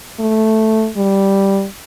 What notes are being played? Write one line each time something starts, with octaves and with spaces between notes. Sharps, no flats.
A3
G3